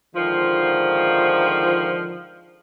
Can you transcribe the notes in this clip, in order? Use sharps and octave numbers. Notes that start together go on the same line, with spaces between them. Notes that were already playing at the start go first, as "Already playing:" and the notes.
G#2 D3 D#3 F3